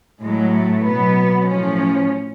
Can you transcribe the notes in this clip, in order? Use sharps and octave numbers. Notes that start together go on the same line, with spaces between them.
A2 F#3 G#3
A3
B2 F#3 B3
A2 F3 C#4